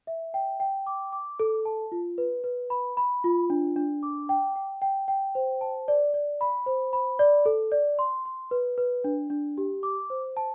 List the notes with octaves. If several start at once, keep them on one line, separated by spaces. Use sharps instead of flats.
E5
G5
G5
D6
D6
A4
A5
F4
B4
B4
B5
B5
F4
D4
D4
D6
G5
G5
G5
G5
C5
A5
D5
D5
B5
C5
B5
D5
A4
D5
C6
C6
B4
B4
D4
D4
G4
D6
C5
A5